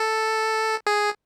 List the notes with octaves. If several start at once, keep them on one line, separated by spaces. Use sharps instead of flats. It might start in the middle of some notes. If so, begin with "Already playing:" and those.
Already playing: A4
G#4